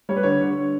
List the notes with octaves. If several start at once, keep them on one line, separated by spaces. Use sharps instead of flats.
G3 C#5
B4
D3 C#5
D3